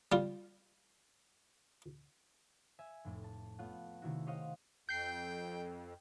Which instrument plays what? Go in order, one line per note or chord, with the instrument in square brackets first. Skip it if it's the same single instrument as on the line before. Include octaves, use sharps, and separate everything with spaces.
[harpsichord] G3 F4
[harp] E5 G#5
F1 A2
A5
A3 B3 F4 C#5 F#5
C3 D#3 A3 E4 F#4
G4 C5 C#5 D#5 F5 F#5
[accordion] F2 [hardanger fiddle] G5 [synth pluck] G6 C7